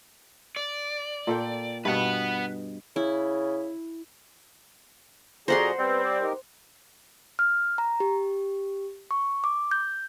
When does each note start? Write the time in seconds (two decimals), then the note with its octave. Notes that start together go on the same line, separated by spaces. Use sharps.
0.56 D5
1.27 A#2 A4 G5
1.85 G2 B2 B4 F#5
2.96 C#3 E4
5.48 F2 F#4 G#4 C5 D5 F#5 A#5 C6
5.78 G3 B3 C4
6.03 D5
6.20 D#4 G4 A#4
7.39 F6
7.78 A#5
8.00 G4
9.11 C#6
9.44 D6
9.71 G6